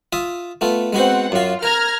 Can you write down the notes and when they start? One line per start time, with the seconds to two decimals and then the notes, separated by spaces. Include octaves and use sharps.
0.13 F4 E5 D#6
0.61 A3 B3 F4
0.93 G#3 B3 C4 F#4 F#5
1.32 F#2 F4 F#4
1.63 A#4 A#5 F6 G#6